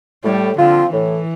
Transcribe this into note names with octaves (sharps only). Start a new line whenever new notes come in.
A2 G3
D3 F3 C4 F4
A2 E3